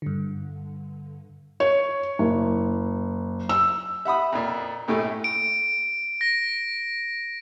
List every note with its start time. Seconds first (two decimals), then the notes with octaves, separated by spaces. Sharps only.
0.02 G2 D3
1.60 C#5
2.19 F#1
3.49 E6
4.05 E5 F#5 B5 D#6
4.32 F2 A#2
4.88 A#1 A2 A3
5.24 D7
6.21 A#6